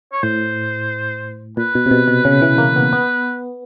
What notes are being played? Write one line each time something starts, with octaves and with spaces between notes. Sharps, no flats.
C#5
A2 C5
A#2 B4
B2
C3
B2
B2
C#3
E3
A#3
B3
B3